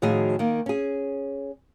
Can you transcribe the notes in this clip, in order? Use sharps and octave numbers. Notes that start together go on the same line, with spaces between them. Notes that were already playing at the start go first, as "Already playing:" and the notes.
A2 D#3 F3 F#4 G#4
D#3 A#3
C#4 G#4